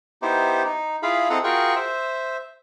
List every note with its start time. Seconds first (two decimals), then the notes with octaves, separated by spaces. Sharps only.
0.22 B3 D#4 E4 G4 C5
0.65 D#4
1.03 E4 F4 G#4 F5 B5
1.30 C4 E4 A4 D#5 F#5 A#5
1.44 F4 F#4 G#4 A#4 G5 C#6
1.75 C5 E5